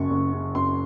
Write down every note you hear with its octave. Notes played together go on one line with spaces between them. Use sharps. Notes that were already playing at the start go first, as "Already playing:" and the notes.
Already playing: F#1 F#2 C#6
F#1
C#3
F#2 C6